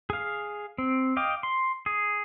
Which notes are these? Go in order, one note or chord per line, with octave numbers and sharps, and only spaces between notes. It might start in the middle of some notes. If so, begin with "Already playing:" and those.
G#4 F5
C4
D#5 F5 G5 D6
C6
G#4